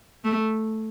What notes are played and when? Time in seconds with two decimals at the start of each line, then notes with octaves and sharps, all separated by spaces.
0.24 A3